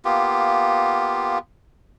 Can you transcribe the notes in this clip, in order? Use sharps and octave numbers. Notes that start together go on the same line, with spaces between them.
A#3 B3 F4 G4